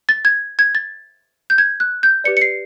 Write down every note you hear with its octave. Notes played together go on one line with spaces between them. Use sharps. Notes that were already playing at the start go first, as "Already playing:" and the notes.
A6
G#6
G#6
A6
G6
G#6
F#6
G6
G4 B4 D5 C#7
C#7
C7